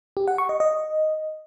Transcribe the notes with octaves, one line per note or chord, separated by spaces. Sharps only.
G4
F#5
C#6
D#5
D#5